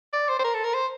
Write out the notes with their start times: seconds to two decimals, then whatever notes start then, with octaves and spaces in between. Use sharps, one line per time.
0.13 D5
0.29 C5
0.39 C5
0.44 A#4
0.54 A4
0.64 A#4
0.74 C5